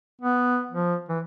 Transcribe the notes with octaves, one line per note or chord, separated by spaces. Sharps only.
B3
F3
E3